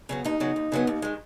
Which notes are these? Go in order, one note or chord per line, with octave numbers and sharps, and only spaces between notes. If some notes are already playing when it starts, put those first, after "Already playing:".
C#3 F#3 B3
D#2 D#4
C#3 F#3 B3
D#2
C#3 F#3 B3
D#2
D#3 G#3